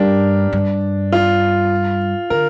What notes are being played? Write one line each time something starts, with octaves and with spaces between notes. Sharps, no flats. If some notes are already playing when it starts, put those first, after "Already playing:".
Already playing: G2 D4 G4 A#4
G2
F4
D3 A#4